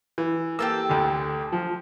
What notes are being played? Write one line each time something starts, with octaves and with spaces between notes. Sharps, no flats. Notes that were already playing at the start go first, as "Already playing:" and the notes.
E3
A#3 G4 A4 E6
D2 D3
F3